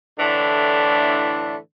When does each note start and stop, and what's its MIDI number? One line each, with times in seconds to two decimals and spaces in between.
0.19 1.57 45
0.19 1.57 50
0.19 1.57 52
0.19 1.57 57
0.19 1.57 62